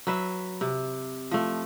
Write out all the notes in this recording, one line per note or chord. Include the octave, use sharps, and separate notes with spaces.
F#3 B4 E5
C3
F3 A3